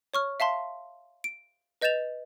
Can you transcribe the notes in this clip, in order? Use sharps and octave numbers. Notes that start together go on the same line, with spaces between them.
C#5 C#6 F6
E5 F5 A5 C6
D7
B4 D#5 G6 A6 E7 F7